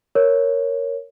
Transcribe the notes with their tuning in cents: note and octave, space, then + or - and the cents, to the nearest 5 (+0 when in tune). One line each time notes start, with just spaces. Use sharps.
A#4 +0 C#5 +0